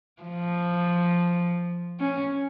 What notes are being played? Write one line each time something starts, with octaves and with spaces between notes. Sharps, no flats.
F3
C#4